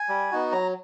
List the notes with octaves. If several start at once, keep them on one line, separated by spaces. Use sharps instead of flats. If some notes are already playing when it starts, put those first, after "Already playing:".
Already playing: G#5
G3
B3 D#4 F#4
F#3 A#5